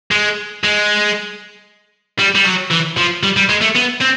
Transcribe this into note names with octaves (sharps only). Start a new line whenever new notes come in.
G#3
G#3
G3
G3
F#3
E3
F3
G3
G3
G#3
A3
B3
C4